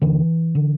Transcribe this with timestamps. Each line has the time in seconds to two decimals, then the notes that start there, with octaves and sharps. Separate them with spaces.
0.02 D#2 D3 E3
0.55 D3